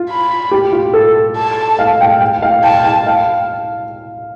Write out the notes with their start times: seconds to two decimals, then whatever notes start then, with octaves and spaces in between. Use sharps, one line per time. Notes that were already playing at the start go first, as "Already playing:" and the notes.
Already playing: F4
0.10 B5
0.51 G4
0.72 F4
0.94 A4
1.37 A5
1.79 F5
2.01 G5
2.21 G5
2.42 F5
2.64 G5 A5
2.84 G5
3.07 F5